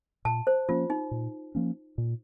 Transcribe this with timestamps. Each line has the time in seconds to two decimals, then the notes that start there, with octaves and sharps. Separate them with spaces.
0.25 A#2 A5
0.47 C5
0.69 F3 A#3 C#4 F4
0.90 D#4
1.11 A#2
1.55 F3 A#3 C#4
1.98 A#2